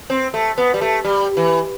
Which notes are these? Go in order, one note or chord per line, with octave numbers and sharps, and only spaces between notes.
C4
A3
B3
G3
A3
G3
E3